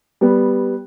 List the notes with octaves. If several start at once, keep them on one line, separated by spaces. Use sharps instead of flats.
G3 B3